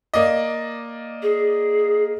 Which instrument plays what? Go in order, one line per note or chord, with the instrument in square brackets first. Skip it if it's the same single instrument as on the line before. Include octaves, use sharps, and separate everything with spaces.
[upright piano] A#3 D5 D#5
[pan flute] G#4